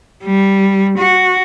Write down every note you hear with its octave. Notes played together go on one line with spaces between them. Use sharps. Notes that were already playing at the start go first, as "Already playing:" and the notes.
G3
F#4